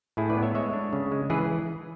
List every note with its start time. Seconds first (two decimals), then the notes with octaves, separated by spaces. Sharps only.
0.17 A2 E4 G#4
0.30 B4 D5
0.37 B3
0.43 C#5 E5
0.55 G#3 C#5 E5
0.73 D4
0.93 C#3
1.12 G#3
1.30 E3 G#4 B4